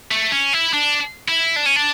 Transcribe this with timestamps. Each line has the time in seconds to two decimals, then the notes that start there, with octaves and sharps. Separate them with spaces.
0.12 A3
0.32 C#4
0.53 E4
0.73 D4
1.28 E4
1.56 D4
1.66 C#4
1.76 D4